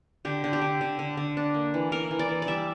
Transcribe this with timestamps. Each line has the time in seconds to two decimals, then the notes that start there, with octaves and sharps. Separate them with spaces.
0.25 D3 G4
0.44 D3
0.53 G4
0.61 D3
0.81 D3
0.99 D3
1.17 D3
1.37 D4
1.54 A#3
1.74 E3
1.92 E3 A#4
2.11 E3
2.19 D5
2.29 E3
2.42 D5
2.47 G3 E5